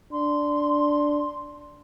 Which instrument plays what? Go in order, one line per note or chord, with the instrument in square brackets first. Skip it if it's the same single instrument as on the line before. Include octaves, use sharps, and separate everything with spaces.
[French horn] D4 [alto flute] C6